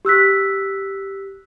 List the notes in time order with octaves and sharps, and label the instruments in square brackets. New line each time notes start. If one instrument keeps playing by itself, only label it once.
[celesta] G4 E6 F#6 B6